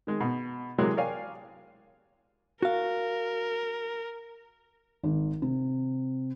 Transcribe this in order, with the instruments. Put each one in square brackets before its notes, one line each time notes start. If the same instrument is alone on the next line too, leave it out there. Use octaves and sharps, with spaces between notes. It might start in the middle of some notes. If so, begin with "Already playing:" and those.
[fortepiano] D#3 G#3
B2
C3 E3 F#3 G#3 A#3
A#4 C#5 D5 F5 G5 G#5
[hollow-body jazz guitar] F#4 F5 [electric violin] A#4
[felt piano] G#1
C3